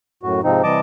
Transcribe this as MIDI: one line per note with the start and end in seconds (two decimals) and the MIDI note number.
0.23 0.41 42
0.23 0.41 45
0.23 0.41 66
0.44 0.62 44
0.44 0.62 48
0.44 0.62 53
0.44 0.62 60
0.44 0.62 63
0.63 0.80 48
0.63 0.80 52
0.63 0.80 55
0.63 0.80 75
0.63 0.80 81
0.63 0.80 86